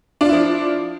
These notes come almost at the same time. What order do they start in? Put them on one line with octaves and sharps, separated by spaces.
D4 F4 E4 F3